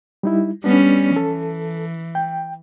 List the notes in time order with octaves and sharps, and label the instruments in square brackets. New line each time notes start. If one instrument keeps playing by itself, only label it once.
[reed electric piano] G3 D#4 E4
[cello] G3 C#4 [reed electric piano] B3 D4
[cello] E3 [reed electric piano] A4
[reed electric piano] G5